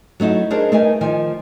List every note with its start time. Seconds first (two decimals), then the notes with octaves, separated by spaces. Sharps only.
0.20 F#3 A3 D#4 E4 F#4
0.51 D4 D#4 G#4 A#4 C5 D5
0.72 A3 B3 D#4 A#4 D#5 G#5
1.01 D#3 F3 G#5